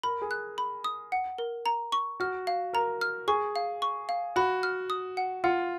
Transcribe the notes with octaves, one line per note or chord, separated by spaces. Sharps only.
A#4 B5
G#4
F#6
B5
D#6
F#5
A#4
A#5
C#6
F#4 F6
F5
A#4 A#5
F6
G#4 C#6
F5
C#6
F5
F#4 B5
F6
D#6
F#5
F4 F#5